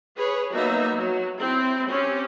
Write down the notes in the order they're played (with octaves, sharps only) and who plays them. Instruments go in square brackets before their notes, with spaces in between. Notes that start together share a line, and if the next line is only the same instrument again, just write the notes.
[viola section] G#4 B4 C#5
F#3 A#3 B3 D#4 E5
F#3
C4 E4
C4 C#4 G4